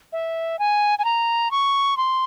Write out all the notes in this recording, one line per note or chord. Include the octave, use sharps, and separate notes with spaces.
E5
G#5
G#5
A#5
C#6
C6